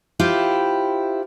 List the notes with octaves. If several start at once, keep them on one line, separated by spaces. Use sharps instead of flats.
E4 F4 G4 C5